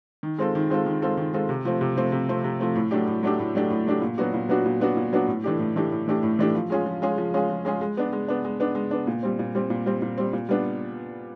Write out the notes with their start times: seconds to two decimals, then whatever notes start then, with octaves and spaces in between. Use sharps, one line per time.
0.23 D#3
0.38 G#3 C4 F4 A4
0.55 D#3
0.70 G#3 C4 F4 A4
0.86 D#3
1.02 G#3 C4 F4 A4
1.17 D#3
1.34 G#3 C4 F4 A4
1.49 C3
1.65 F3 A3 C4
1.81 C3
1.96 F3 A3 C4
2.12 C3
2.29 F3 A3 C4
2.44 C3
2.60 F3 A3 C4
2.76 A2
2.91 F#3 A3 D4 G4
3.07 A2
3.23 F#3 A3 D4 G4
3.39 A2
3.55 F#3 A3 D4 G4
3.70 A2
3.86 F#3 A3 D4 G4
4.02 A#2
4.18 F#3 B3 D4 F#4
4.34 A#2
4.49 F#3 B3 D4 F#4
4.66 A#2
4.80 F#3 B3 D4 F#4
4.97 A#2
5.13 F#3 B3 D4 F#4
5.28 A2
5.44 E3 A3 D4 G4
5.59 A2
5.76 E3 A3 D4 G4
5.91 A2
6.08 E3 A3 D4 G4
6.23 A2
6.39 E3 A3 D4 G4
6.55 F3
6.70 G#3 C#4 F4 G#4
6.86 F3
7.02 G#3 C#4 F4 G#4
7.18 F3
7.34 G#3 C#4 F4 G#4
7.49 F3
7.65 G#3 C#4 F4 G#4
7.81 G#3
7.97 B3 D4
8.13 G#3
8.28 B3 D4
8.45 G#3
8.60 B3 D4
8.75 G#3
8.91 B3 D4
9.07 A#2
9.23 G3 C4
9.39 A#2
9.55 G3 C4
9.70 A#2
9.86 G3 C4
10.02 A#2
10.18 G3 C4
10.33 A#2
10.49 G3 B3 D4